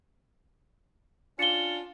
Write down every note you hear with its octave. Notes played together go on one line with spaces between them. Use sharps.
C#4 D4 F4 C#7 G7